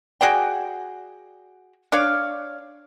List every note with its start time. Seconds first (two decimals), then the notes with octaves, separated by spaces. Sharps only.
0.21 F#4 G#4 D5 G5
1.92 D4 C#5 D5 F5